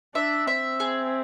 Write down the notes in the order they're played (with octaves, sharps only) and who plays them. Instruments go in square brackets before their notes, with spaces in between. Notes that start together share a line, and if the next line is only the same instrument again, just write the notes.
[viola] D4 [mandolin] E5
[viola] C4 [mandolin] E5
[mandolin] G#4